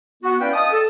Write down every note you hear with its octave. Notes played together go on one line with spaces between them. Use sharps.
B3 F#4
C#4 E4 B4 D5 F5 G5
D#5 F5 A5 D#6
A4